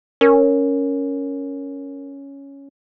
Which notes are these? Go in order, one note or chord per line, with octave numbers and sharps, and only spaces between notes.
C#4 A#4